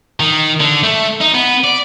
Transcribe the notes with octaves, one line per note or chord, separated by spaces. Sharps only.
D#3
D3
A3
D#4
B3
D5